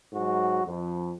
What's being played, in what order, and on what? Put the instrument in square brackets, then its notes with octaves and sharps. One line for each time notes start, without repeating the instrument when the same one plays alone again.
[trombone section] G#2 F#3 F#4
F2